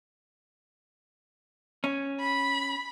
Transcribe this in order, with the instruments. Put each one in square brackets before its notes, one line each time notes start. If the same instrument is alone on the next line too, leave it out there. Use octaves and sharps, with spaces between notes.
[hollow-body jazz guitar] C#4
[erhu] B5